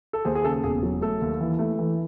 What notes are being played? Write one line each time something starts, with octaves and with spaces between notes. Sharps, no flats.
A4
D#2 G#4 C5
G#4
C#3 A4
E1 G#4
F#3
A3 A4
D#2
E3
A3
E3